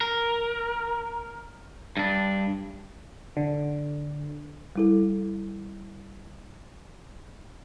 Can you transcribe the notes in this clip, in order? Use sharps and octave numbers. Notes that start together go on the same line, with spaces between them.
A#4
G2 D4
D3
G3 E4 A4